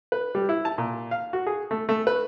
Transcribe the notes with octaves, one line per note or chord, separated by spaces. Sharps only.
B4
G3
E4
A5
A#2
F5
F#4
G#4
A3
A3
B4